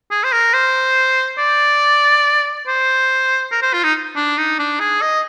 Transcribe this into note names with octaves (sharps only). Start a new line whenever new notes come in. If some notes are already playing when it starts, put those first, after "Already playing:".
G#4
C5
A#4
C5
D5
C5
A#4
C5
F4
D#4
D4
D#4
D4
G#4
D#5